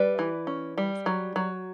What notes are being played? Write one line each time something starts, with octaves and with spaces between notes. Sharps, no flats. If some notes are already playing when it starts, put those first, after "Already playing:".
Already playing: G3 B4 D5
E3
C#4
G3
F#3
F#3